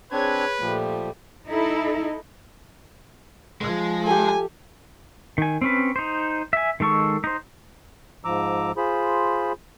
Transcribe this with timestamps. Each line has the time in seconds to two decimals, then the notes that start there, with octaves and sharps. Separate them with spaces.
0.12 C4 D4 G#4 B4 C#5 G#6
0.61 A#2 F3 G3 A3
1.48 D#4 E4 A4
3.61 F3 G#3
4.07 G4 A4 G#5
5.38 D#3 G#5
5.62 C4 C#4 B4
5.96 D#4 C5
6.53 E5 G#5
6.80 D#3 G#3 A4 C#6
7.24 D#4 C5
8.25 G#2 F3 A#5 D6 E6
8.77 F4 G#4 C5 B5